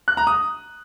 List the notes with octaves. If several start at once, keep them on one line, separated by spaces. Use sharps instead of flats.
F#6
A#5
D#6